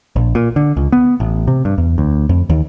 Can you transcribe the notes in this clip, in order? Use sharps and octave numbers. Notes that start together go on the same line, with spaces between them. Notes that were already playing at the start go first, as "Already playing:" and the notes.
A#1
A#2
D3
C#2
B3
A1
C3
G2
E2
D2
F2
D#2